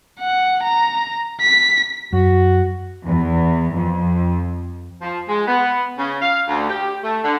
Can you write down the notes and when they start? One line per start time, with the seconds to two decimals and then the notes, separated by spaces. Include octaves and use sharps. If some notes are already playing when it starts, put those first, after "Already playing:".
0.20 F#5
0.63 A#5
1.41 B6
2.13 F#2 F#4
3.06 E2
3.77 F2
5.02 F3
5.29 G#3
5.48 B3
5.98 C#3
6.21 F5
6.48 D2
6.69 G4
7.04 A3
7.24 D3